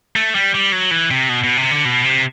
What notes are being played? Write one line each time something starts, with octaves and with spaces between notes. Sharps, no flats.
A3
G3
G3
F#3
E3
C3
B2
B2
C3
D3
B2
C3